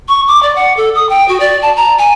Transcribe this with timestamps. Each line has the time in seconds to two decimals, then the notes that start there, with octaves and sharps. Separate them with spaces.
0.08 C#6
0.28 D6
0.43 D5
0.56 F#5
0.77 A4
0.95 D#6
1.09 G5
1.28 F#4
1.40 D5
1.62 A5
1.76 A#5
1.98 G#5